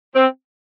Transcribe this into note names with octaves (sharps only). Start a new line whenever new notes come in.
C4